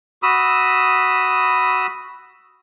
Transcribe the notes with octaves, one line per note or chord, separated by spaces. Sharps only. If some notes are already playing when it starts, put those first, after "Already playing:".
F#4 B5 D#6 E6